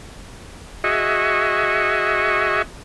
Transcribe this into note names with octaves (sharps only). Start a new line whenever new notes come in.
F#4 G#4 D#5 E5 C#6